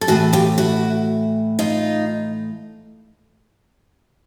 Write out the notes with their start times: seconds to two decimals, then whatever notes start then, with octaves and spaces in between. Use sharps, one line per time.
0.01 A4
0.07 A2 E3 A3 F#4 G#4
0.33 F4 G4
0.58 E4 F#4
1.59 D#4 F4